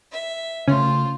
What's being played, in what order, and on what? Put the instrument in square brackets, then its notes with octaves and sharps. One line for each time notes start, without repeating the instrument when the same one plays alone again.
[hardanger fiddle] E5
[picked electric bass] C#3 A3 [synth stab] C#4 [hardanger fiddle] F4 C5